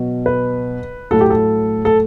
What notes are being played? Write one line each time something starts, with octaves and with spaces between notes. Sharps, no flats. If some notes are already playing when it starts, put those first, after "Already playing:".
Already playing: B2 F#3
B4
A2 F#3 A4
G4
A4
A4